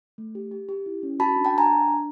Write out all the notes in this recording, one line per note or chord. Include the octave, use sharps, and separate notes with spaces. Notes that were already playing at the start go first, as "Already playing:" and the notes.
A3
G4
G4
G4
E4
C#4
F#4 A5 B5
D4
G5 A5
D4 G#5 A#5
D4
D4